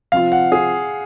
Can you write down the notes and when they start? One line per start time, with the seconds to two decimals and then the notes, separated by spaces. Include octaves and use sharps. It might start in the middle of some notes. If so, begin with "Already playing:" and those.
0.12 C3 F3 C4 F4 F5
0.32 F#5
0.52 G#4